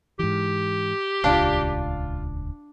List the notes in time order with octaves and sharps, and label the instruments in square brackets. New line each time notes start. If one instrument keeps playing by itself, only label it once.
[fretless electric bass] G#2 E3 [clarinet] G4
[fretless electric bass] D#1 C#2 [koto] D4 [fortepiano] F4 F5